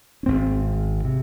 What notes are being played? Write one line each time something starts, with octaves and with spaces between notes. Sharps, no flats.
C#4
G#1 G#2 C4
C3